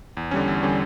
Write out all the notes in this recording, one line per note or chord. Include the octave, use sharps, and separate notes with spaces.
E2
D3 G3 C#4
E2
D3 G3 C#4